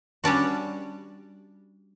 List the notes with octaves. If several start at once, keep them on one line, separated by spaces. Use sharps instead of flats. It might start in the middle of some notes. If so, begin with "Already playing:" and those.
G3 C#4 D4 F#4